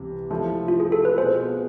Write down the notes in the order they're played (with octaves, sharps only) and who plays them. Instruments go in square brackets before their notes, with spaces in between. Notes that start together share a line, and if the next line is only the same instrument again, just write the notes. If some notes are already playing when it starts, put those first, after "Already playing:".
Already playing: [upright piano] C2 C3 E3 B3
C3 F3 A3 C4 E4
[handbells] F4
G#4
A4
B4
[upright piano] B2 B3 F4 G#4 [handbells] C5